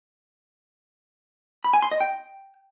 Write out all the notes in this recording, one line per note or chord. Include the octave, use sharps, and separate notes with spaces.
B5
G#5
C6
D#5
G5